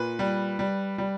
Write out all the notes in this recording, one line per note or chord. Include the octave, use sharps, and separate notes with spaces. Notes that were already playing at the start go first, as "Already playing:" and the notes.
Already playing: A#2 B4
G3
G3
G3